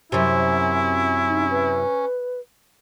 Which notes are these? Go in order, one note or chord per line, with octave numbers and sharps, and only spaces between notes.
F#2 C3 C#4 E4
D#4
B4